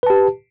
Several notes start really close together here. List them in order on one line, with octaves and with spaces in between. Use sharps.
B4 A5 G4